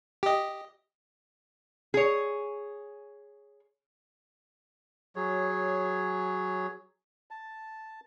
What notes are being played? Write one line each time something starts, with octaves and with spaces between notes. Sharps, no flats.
G4 D#5
G#4 C#5
F#3 G#4 C#5
A5